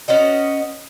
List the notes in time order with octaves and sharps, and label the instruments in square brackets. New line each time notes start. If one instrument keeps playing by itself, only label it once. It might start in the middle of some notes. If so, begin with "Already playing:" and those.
[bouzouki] B3 C#4 F#4 D#5